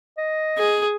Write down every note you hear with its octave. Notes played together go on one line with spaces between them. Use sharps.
D#5
G#4